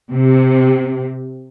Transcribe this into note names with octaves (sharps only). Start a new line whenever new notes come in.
C3